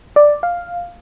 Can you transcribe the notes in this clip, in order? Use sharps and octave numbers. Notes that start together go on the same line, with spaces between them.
D5
F5